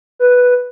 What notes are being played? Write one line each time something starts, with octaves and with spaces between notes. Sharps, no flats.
B4